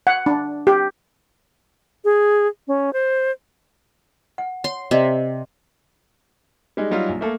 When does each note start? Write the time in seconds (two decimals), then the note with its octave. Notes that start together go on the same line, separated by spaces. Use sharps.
0.07 F#5
0.26 D4
0.67 G4
2.05 G#4
2.68 C#4
2.93 C5
4.38 F#5
4.64 C#5 C6
4.91 C3 D5 D#5
6.77 G3 G#3 D#4
6.91 F#3 G3 D#4 F4
7.09 A#1
7.21 A3 A#3 A4